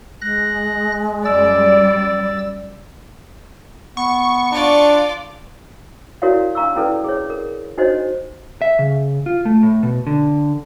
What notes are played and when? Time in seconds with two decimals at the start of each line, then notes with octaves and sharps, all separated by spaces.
0.21 G#3 F#6 A#6
1.25 F#2 G3 D5 E6 A6
3.97 B3 C#6
4.52 D4 F4 D5
6.22 E4 F#4 A#4 C#5 D5 F5
6.55 D4 F5 A#5 C#6 E6
6.76 C#4 E4 A4 B4 D5
7.04 G#4 C#5
7.30 A#4
7.78 D4 D#4 F#4 C5 C#5 D#5
8.62 E5
8.79 C#3
9.26 F4
9.45 A3
9.63 A2
9.83 B2
10.07 D3